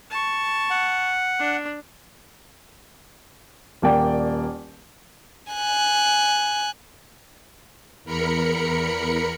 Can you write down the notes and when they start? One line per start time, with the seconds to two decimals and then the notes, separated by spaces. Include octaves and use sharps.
0.10 A5 C#6
0.70 F#5
1.39 D4
3.82 D#1 A#3 D5 G5
5.52 G#5 F#6
8.04 E2 A#4 B5 C#7